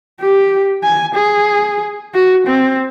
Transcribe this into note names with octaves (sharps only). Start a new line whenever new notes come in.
G4
G#5
G#4
F#4
C4